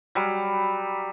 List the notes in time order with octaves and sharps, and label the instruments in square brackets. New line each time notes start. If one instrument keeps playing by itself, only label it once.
[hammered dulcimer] F#3 G3